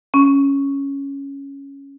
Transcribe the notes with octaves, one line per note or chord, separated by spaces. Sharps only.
C#4